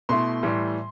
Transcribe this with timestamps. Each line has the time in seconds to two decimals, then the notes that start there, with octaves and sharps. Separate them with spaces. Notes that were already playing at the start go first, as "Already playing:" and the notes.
0.09 B2 A3 E4 C6
0.43 A2 E3 G3